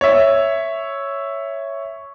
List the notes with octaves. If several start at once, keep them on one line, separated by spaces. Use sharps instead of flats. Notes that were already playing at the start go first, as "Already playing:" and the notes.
C#5 E5